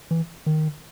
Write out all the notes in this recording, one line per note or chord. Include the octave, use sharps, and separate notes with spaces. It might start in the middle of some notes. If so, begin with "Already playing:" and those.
E3
D#3